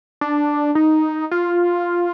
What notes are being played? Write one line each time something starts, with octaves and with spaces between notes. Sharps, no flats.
D4
D#4
F4